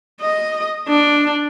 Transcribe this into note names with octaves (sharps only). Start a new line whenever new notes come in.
D#5
D4